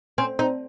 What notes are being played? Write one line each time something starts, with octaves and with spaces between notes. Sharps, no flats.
C4 C#4
C4 D#4